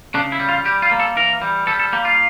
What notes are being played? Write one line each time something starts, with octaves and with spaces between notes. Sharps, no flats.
C#3 D4
E4
G3
F4
G3 G4
F4
A#3
A4
E3 A#4
G3
G3 A4
A4
A#3 G4
F4